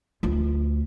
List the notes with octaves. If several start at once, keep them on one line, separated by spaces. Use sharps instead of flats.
D2 F4